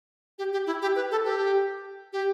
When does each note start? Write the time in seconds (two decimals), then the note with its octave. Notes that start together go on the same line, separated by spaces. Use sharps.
0.39 G4
0.53 G4
0.67 E4
0.82 G4
0.96 B4
1.11 A4
1.25 G4
2.13 G4